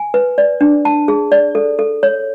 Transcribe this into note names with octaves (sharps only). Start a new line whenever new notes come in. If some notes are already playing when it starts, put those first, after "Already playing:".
Already playing: G#5
B4
D5
D4
A5
G#4
D5
A4
A4
C#5